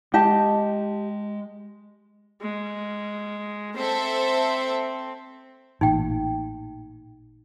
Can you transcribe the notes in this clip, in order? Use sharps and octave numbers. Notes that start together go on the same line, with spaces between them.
G#3 G4 D#5 A5
G#3
C4 A4 C5 E5
A1 A#2 D#4 G5